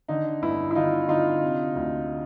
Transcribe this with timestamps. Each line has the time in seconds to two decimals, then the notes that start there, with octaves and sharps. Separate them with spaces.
0.08 D3 D#4
0.42 G1 E4
0.71 E4
0.75 D3 D#4 F4
1.08 D3 D#4 F4
1.42 C3
1.76 D2